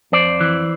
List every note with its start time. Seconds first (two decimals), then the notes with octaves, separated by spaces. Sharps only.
0.12 F2 C5 D5
0.41 E3